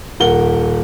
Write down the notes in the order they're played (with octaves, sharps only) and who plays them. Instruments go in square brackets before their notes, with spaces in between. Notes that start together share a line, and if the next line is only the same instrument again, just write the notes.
[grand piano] D#1 A#4 F#5 G7